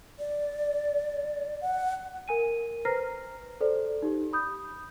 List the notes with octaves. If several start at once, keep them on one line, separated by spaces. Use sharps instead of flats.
D5
F#5
A#4 G#5 D#7
B4 C5 A#5 F6 A#6 C7
A4 C5 D5
D#4 G4
B5 D#6 G6